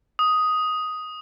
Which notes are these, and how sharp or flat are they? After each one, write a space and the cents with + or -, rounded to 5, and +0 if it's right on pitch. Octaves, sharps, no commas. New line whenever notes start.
D#6 +5